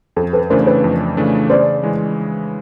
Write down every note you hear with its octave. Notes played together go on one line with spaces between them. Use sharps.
F2 A4
A4 B4
C#3 E3 A3 D4 A#4 C5
B4 C#5
F2
C#3 E3 A3 D4
C#3 C5 D5
E3 G#3